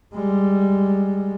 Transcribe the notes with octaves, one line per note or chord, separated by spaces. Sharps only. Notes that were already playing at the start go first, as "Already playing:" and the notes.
G3 G#3